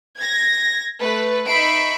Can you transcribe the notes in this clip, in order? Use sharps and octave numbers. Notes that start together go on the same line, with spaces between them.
G#6 A#6
A3 B4
D#4 E5 B5 C#6 C7 D7